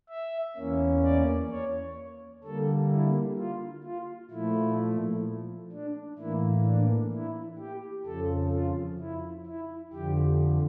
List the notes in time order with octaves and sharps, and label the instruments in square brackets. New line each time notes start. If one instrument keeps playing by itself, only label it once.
[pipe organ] E5
E2 E3 A#3 C#4
D5
C#5
D3 G3 A#3 A4
E4
F4
F4
A#2 F3 A3 E4
D4
A2 E3 A#3 E4
D4
E4
G4
F2 C#3 F3 A4
F4
E4
E4
F2 D3 F3 G4